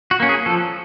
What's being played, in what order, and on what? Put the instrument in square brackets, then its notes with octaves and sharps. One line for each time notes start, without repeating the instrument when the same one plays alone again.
[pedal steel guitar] F#4
A#3 C#4
G#4
F3 A4